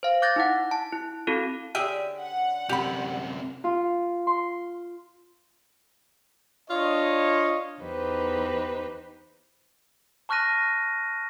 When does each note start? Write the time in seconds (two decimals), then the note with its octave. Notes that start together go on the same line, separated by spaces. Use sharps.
0.03 C5 F5
0.22 D6 F#6 G6 A6 A#6
0.36 D#4 E4 F#5
0.71 A5
0.92 E4
1.27 C4 E4 F#4 A4
1.75 D3 C#4 G4 G#4 E5
2.20 F#5
2.69 F#2 C3 G4 B5
3.64 F4
4.27 C6
6.70 D4 F4 C#5 D#5
7.80 E2 D#4 G4 B4 C5
10.29 A5 C#6 F6 F#6 A#6 D#7